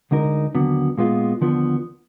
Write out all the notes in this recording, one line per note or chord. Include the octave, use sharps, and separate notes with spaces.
D2 D3 G#3 D#4 A#4
D#2 D3 F#3 B3
A#2 G#3 B3 F4
D#2 D3 F3 B3